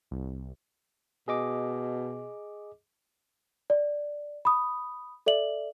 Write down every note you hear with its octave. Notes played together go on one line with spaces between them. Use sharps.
C2
B2 G#4 D#5 D6
D5
B5 D#6
A4 D5 E5 F#7